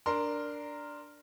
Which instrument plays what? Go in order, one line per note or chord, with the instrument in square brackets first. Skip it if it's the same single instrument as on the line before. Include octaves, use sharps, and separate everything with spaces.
[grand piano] D4 A#4 C6